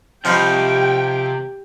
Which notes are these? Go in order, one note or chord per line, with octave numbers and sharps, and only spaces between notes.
C3 F3 D#4 F4 G4 G5 B5